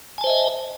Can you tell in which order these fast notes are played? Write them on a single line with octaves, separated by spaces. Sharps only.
G#5 A5 C5 E5 D#5